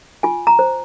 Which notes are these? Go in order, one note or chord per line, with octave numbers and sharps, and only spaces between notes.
F4 G#5
A#5
C5